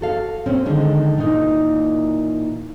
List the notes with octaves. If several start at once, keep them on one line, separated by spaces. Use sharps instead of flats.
F#4 A4 F5
A#2 C4 C#4
D3 D#3 G#3
A#2 E3 A#3 D#4